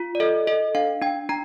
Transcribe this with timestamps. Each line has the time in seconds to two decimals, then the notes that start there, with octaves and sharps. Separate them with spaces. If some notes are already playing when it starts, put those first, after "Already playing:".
Already playing: F4
0.15 D5
0.20 A4 D#5
0.47 A4 D#5
0.75 D4 F5
1.02 D4 G5
1.29 D4 A#5